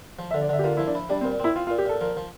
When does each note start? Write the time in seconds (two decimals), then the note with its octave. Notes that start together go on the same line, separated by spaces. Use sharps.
0.19 F3
0.31 E5
0.34 D3
0.41 D5
0.49 D3 E5
0.59 G4
0.64 A#3 F4
0.77 F3 E4
0.87 D4
0.95 E4
1.09 G3 D4
1.21 C4
1.25 A#2
1.40 C4 E4
1.56 C4 F4
1.67 F4
1.70 A#2
1.78 G4
1.85 A#2 A4
2.01 F3 A#4
2.17 F3